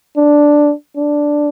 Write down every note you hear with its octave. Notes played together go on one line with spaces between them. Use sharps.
D4
D4